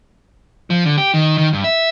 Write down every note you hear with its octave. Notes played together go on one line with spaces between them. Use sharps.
F3
D3
G4
D#3
D#3
G2
E5